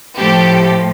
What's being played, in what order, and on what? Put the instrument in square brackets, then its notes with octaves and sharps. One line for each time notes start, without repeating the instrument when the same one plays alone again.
[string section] A2 F3 G4 A4